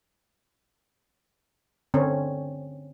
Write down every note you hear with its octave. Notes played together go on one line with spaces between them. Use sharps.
D3 C4 C#4